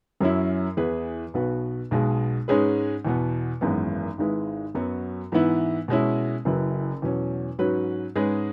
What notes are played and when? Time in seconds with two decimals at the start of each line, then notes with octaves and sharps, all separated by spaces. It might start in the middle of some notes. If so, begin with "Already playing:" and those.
0.20 F#2 F#3 C#4 E4
0.77 E2 E3 B3 G#4 B4
1.34 B1 B2 B3 F#4 B4
1.91 B1 B2 G#3 B3 G#4
2.48 G#2 G#3 C#4 G#4 B4
3.05 E2 B2 B3
3.61 G#1 F#2 E3 G#3 B3
4.18 G#1 G#2 G#3 E4 B4
4.75 F#2 F#3 B3 F#4
5.32 G#2 E3 B3 E4
5.88 B2 G#3 C#4 E4
6.45 F#1 F#2 F#3 E4 B4
7.02 E2 B2 F#3 C#4
7.59 G#2 F#3 C#4 F#4 B4
8.15 G#2 G#3 C#4 G#4 B4